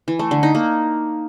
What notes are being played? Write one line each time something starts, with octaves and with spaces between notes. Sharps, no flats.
E3
A3
D3
D#4
A#3